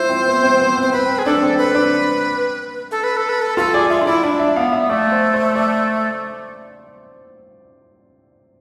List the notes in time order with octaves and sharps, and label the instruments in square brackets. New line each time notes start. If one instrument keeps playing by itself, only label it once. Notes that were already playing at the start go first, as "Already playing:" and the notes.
Already playing: [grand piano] E4 F4 [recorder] C5
[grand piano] C4
B3
C4
B3
C4
[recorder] C5
[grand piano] C4 [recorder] B4
[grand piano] C4
[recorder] G#4
[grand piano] D4 [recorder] A4
[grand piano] C4
[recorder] B4
[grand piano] D4
[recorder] A4
B4
A4
B4
A4
[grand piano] F4 [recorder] A4
[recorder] G#4 [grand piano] D5
[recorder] F4 [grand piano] E5
[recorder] D4
[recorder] E4 [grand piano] D5
[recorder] D4 [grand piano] D5
[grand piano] E5
[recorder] B3 [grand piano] F5
[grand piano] E5
[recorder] A3 [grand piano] D5
[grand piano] C5
C5
D5